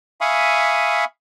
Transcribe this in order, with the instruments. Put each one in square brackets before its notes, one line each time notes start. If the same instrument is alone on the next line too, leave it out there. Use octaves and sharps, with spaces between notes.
[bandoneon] E5 F5 G#5 B5 C#6 D#6